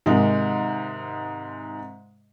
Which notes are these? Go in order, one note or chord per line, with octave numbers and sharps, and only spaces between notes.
G#2 C3 D#3 G#3 D#4